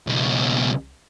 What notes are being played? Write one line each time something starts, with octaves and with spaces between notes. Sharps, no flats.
C#2 B2